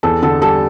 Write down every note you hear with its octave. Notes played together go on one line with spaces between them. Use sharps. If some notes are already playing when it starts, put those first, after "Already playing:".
E2 A4 A5
D3 A4 A5
G3 A4 A5